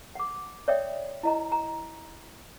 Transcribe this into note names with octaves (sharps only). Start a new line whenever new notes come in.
F#5 D6
C#5 D5 E5 G5 D#6
E4 D#5 A#5
A#5